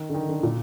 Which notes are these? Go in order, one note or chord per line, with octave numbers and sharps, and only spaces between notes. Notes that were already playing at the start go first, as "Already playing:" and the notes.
Already playing: D#3
D3
D#3
D3
A#2